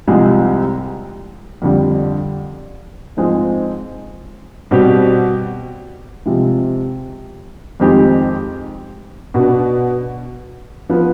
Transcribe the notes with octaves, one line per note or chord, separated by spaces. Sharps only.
C2 C3 F3 G#3
F2 D3 G3
G#2 F3 G#3 C4
B2 G3 C4 G4
C3 F3 G#3
F2 D#3 G#3 C4 G4
B2 B3 D4
F3 B3